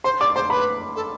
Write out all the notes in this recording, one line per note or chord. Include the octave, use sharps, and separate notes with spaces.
C5 C6
D5 D6
C5 C6
B4 B5
A4